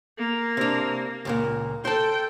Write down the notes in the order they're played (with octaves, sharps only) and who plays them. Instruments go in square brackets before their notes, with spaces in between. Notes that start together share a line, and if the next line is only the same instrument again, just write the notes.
[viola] A#3
[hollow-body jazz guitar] C3 D4
C#2 A#2 A#3
[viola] A4 G5 [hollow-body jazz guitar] C5 A5